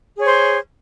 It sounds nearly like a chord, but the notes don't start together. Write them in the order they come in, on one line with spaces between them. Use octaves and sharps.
G#4 C#5 C5